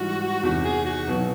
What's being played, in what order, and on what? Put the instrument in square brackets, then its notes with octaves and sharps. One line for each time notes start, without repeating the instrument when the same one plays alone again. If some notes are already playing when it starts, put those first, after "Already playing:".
Already playing: [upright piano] G#2 E3 G3 [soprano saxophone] F#4
[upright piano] E2 C3 D#3 [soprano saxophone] F#4
[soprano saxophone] G#4
F#4
[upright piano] B1 B2 F#3 B3